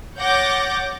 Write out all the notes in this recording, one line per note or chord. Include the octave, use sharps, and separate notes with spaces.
C#5 F#5 D6 G6 A6 A#6